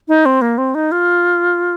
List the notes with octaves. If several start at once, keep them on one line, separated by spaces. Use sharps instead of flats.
D#4
C4
A#3
C4
D#4
F4